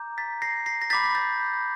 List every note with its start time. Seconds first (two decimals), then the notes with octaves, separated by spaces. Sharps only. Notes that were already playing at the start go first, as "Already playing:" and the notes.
Already playing: A#5 D6 G6
0.18 A6 B6
0.42 A#6 C7
0.66 A#6 C7
0.82 A#6
0.90 B5 D6 G6 A6 B6
1.15 G6 A6